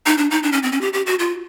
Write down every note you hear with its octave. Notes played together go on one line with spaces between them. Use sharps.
D#4
D4
D#4
D4
C#4
C4
C#4
G4
G4
F#4
F4